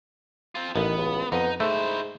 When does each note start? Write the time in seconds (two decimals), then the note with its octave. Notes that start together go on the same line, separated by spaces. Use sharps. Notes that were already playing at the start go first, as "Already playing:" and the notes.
0.55 C4 F4
0.76 A1 D#3 B3
0.98 C#2
1.32 F2 B3 D#4
1.60 G#2 A3 E4 C5